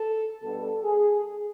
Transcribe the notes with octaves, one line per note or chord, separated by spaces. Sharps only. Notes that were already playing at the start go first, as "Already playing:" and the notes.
Already playing: A4
B2 G3 B3 D4 A4
G#4